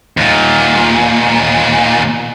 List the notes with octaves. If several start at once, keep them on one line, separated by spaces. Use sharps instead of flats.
D#2 A#2